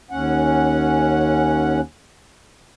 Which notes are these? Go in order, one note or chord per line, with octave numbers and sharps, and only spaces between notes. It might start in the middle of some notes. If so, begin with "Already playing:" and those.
D#2 C#4 F#5